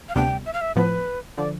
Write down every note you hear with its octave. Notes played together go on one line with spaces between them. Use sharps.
F5
D2 C3 G3 B3 D4 G5
E5
F5
E5
A2 F3 B3 B4
D3 F3 D5